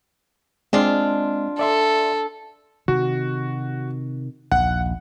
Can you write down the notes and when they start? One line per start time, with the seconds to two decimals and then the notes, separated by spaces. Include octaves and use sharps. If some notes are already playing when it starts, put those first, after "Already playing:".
0.73 G#3 C4 D4 F4 D#5
1.59 A4 D5 E5 C6
2.88 C3 D#3 F#4
4.52 A#1 D#2 F#5